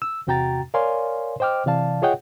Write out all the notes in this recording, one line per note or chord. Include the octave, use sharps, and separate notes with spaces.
E6
E2 C3 F#4 G5 A#5 A6
A#4 C#5 D5 F5 G#5 C6
C5 D#5 G5 D6 F6
C3 E3 D5 F5 A5
F4 G#4 C#5 D#5 F#5 G5